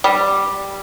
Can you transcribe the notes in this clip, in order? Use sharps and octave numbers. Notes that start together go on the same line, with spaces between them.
G3